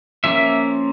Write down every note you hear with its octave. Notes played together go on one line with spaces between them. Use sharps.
F3 A#3 C#4 E5